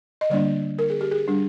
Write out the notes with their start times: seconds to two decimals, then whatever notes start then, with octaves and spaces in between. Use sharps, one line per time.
0.21 D#5
0.30 D3 G3 A#3 D4 D5
0.79 A#4
0.90 G#4
1.01 G4
1.11 G#4
1.28 G3 D4